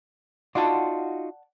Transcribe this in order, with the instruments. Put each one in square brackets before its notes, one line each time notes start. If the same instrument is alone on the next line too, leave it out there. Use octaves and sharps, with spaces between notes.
[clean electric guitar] D#4 F4 F#4 [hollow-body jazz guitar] D5 F#5 A5